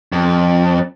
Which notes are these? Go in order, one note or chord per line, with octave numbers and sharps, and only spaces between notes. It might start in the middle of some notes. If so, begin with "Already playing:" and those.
F2